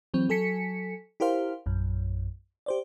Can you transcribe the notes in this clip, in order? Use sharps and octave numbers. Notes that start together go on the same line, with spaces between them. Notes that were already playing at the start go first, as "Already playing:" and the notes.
E3 F#3 C4
F#3 A4 G#5 B6 C#7
E4 G4 A#4 C5 F5
A#1 F#2
G4 C5 D5